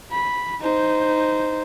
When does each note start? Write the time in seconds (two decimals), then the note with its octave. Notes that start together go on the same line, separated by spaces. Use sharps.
0.12 B5
0.61 D#4 C5